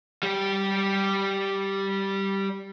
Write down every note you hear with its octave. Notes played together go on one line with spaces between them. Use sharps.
G3 G4